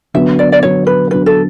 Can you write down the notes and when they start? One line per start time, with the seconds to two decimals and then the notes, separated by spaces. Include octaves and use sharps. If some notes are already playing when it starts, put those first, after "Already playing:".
0.14 D3 F#3 B3 E5
0.39 D5
0.52 D5
0.63 D3 F#3 B3 C#5
0.87 B4
1.10 D3 F#3 B3 B4
1.26 A4